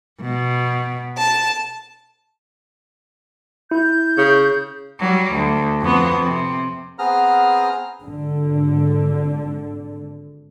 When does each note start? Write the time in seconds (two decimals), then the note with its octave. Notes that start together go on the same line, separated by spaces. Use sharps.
0.21 B2
1.16 A5
3.71 E4 G6
4.18 C#3
5.00 F#3 G3
5.33 D2
5.81 F2 B3
6.26 C3
6.99 B3 C4 G#4 A#5 F6
8.01 G#1 D3